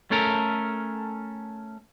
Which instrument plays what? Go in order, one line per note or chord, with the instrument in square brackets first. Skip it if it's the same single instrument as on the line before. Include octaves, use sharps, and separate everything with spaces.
[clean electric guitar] A3 C#4 A4 A#4